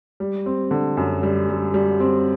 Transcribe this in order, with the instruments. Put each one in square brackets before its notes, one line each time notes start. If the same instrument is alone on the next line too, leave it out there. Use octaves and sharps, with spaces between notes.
[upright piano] G3
C4
D3
F#2
G3
G3
G3
C4